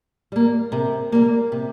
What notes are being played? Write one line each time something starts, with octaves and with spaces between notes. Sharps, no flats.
G3 A#3
C3 A#4
G3 A#3
C3